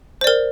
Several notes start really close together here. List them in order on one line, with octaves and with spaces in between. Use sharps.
C5 D5 A#4